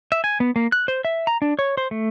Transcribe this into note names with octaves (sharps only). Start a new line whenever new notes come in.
E5
G#5
B3
A#3
F#6
C5
E5
A#5
D4
C#5
C5
A3